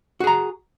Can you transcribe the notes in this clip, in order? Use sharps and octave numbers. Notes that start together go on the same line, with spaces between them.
F#4 G#4 A#5